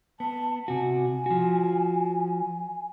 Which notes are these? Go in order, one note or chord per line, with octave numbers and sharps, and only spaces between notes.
B3 A5
C3 F#4 G#5
F3 F#4